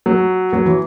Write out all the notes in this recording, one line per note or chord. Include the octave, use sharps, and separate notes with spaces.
F#3
F#3
E3